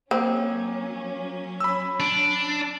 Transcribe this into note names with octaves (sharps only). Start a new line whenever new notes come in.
F#3 A#3 C4 C#4
B5 E6
D4